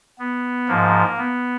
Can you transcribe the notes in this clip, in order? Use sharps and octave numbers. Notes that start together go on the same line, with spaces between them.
B3
G#2 F3 A#3
B3